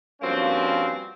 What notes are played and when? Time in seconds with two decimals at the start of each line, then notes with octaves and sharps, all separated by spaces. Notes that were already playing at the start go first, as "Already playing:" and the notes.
0.21 G2 F3 A#3 C4 C#4 F#4